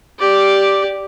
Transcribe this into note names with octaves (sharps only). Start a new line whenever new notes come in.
G4 D5